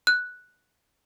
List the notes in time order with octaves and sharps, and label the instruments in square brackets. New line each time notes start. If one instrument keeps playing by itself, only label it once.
[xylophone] F#6